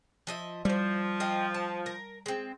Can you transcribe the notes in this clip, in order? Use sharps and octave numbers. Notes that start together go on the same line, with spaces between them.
F3 D#5 E5
F3 G3 E4 C5
D#5 F5 G5
A5
A#4
G#3 C4